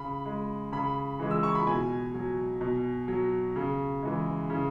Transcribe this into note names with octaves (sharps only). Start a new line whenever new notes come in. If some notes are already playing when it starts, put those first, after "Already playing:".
Already playing: C#3 B5
G#3
C#3 B5
E3 G#3
E6
C#6
B5
B2 G#5
F#3
B2
F#3
C#3
E3 G#3
C#3